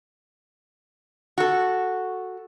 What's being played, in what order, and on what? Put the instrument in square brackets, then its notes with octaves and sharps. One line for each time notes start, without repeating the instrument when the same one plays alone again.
[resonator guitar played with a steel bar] F#4 A4